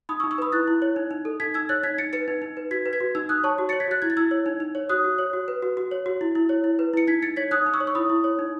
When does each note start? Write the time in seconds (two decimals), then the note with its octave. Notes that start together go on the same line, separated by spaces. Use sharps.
0.09 D#4 B5 D#6
0.20 C#6 E6
0.24 D#4
0.31 C#6 E6
0.38 B4 B5 D#6
0.52 E4 F#6 A6
0.68 E4
0.82 C#5
0.96 D#4
1.11 D#4
1.25 A4
1.40 D#4 G#6 B6
1.54 D#4 E6 G#6
1.69 C#5 F#6 A6
1.83 D#4 G#6 B6
1.98 D#4 A6 C#7
2.13 B4 A6 C#7
2.28 D#4
2.42 D#4
2.57 B4
2.71 F#4 G#6 B6
2.86 B4
2.93 G#6 B6
3.00 F#4
3.15 D#4 E6 G#6
3.29 D#4 D#6 F#6
3.44 C#5 A5 C#6
3.58 F#4
3.69 C#5 A6 C#7
3.80 G#6 B6
3.88 F#4 F#6 A6
4.02 E4 G#6
4.10 A6
4.17 E4 E6 G#6
4.31 C#5
4.46 D#4
4.60 D#4
4.75 C#5
4.89 F#4 D#6 F#6
5.04 F#4
5.18 C#5
5.33 F#4
5.48 B4
5.62 F#4
5.77 F#4
5.91 C#5
6.06 F#4
6.21 E4
6.35 E4
6.49 C#5
6.64 E4
6.79 B4
6.94 E4 C#7
7.07 D#4 G#6 B6
7.22 D#4 A6 C#7
7.36 C#5 G#6 B6
7.51 D#4 D#6 F#6
7.66 D#4
7.74 C#6 E6
7.80 C#5
7.87 C#6
7.95 E4 B5 D#6
8.10 E4
8.24 C#5
8.39 D#4